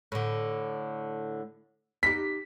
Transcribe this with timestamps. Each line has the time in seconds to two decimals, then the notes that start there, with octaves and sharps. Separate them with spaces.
0.12 A2 D3
2.03 D#4 G4 B6